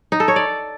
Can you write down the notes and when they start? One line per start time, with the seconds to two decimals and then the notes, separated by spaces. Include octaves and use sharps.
0.12 D#4
0.20 A4
0.28 C#5
0.36 D5